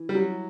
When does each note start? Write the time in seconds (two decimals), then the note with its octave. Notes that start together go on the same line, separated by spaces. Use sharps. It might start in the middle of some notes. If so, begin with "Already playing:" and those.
Already playing: E3
0.09 G3
0.15 F#3